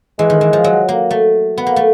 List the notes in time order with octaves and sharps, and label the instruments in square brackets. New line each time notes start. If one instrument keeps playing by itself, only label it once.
[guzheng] E3 [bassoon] G#3
[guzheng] D#3
E3
F3
F#3
A#3
A3
B3
A#3
A3